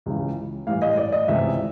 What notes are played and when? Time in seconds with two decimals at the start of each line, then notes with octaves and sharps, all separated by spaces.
0.06 C#2 C#3 E3
0.67 A2 E3 G3 F5
0.82 D#5
0.97 D5
1.12 D#5
1.28 C#2 C3 E3 A3 C#4 E5